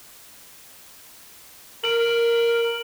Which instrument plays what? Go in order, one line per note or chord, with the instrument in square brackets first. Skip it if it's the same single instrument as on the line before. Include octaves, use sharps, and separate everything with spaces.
[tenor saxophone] A#4 [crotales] D7 F#7